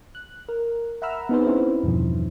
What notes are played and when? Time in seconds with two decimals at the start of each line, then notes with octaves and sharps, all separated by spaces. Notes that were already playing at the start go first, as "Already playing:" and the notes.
0.15 F#6
0.49 A#4
1.02 E5 F#5 A#5 B5 E6 F6
1.29 B3 C4 D#4 G#4 B4 C5
1.47 C#4 E4 C5
1.83 E2 G2 B2 D#3 F3